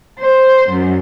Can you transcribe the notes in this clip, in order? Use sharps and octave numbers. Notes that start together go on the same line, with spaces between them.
C5
F#2